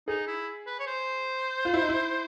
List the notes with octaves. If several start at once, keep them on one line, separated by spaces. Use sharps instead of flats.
D#4 G#4
E4
B4
C#5
C5
F4
E4
D#4
E4